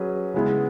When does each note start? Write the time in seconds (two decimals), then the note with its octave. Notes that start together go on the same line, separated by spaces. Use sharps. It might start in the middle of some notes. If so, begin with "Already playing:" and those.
Already playing: F#3 C#4 G#4 B4
0.34 C#3 G#3 B3 E4